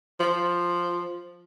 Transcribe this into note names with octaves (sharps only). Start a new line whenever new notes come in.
F3